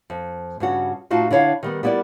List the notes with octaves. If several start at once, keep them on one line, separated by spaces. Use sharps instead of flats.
F2
G2 C#3 F#4
A2 D#4 F4 F#4 A5
D3 E4 C#5 F5
D#3 G3 B3
G3 B3 E4 A#4 D5